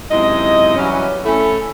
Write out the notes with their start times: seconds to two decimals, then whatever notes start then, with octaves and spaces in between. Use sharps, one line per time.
0.11 F#2 C3 G#3 D#4 E4 D#5
0.76 E3 F#3 G3 C#4
1.24 A3 C#4 E4 A4